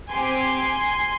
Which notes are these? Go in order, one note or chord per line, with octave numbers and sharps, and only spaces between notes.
C4 G4 G#5 C6